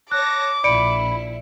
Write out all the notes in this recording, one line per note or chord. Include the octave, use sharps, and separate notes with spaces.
C#5 A5 D6 F#6 A#6
A#1 E4 D5 B5 C#7 D7